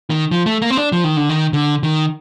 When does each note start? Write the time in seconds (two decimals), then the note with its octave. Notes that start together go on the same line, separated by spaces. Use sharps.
0.10 D#3
0.31 F3
0.46 A3
0.62 A#3
0.70 C4
0.77 D4
0.92 F3
1.04 D#3
1.17 D3
1.29 D#3
1.53 D3
1.83 D#3